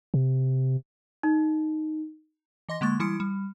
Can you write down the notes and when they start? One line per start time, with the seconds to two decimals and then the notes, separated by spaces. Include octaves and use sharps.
0.14 C3
1.23 D#4
2.69 E3 D#5 C6 A#6
2.81 D3 G#3 A#3 C#6 A6
3.00 E3 G3 E4 C6 D#6 C#7
3.20 G3